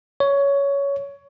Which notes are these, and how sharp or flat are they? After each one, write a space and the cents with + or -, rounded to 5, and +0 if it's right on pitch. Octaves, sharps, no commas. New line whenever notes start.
C#5 +15